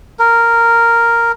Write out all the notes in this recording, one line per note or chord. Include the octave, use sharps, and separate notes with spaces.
A#4